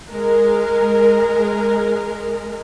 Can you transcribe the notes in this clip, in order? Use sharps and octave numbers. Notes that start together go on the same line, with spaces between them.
G#3 A#4